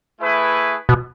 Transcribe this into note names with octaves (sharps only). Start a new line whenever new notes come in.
A3 E4 G#4 B4
B2